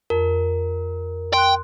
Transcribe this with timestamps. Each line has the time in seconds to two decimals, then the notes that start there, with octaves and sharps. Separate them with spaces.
0.10 F2 A#4
1.33 G5 C6 F#6